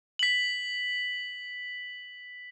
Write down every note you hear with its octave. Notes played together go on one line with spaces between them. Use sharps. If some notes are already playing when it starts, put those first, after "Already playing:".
B6 F#7